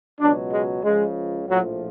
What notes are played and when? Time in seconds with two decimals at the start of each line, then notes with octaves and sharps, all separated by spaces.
0.20 C#2 B2 F#3 D4
0.52 G#3
0.84 C#2 C#3 F3 G#3
1.48 A#1 A2 F3 F#3